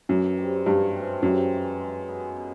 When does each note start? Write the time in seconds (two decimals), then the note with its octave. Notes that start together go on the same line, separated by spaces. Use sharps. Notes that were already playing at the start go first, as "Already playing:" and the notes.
0.09 F#2 E3
0.37 G3 C4
0.66 G2 E3
0.94 G#3 C4
1.22 F#2 C3
1.52 E3 G#3 C#4
1.79 G#3
2.08 B3 D#4 G#4
2.36 B2